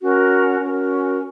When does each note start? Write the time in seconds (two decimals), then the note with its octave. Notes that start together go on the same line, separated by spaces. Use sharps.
0.01 C#4 F#4 A#4
0.60 C#4 F#4 A#4